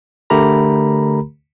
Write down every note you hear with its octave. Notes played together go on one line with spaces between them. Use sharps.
D3 A3 G4 A#4 A#5 B5